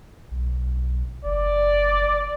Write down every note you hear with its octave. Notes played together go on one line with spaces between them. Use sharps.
B1
F#1 D5